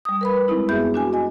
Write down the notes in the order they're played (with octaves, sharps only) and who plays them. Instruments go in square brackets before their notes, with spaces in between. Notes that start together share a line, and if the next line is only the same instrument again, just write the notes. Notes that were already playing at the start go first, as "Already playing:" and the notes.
[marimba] G3 D#6
A#4 B4 B5
G#3 C4 D#4 E4
F#2 B3 G#4 E5 G6
D4 F#4 G#5
D#5 G#5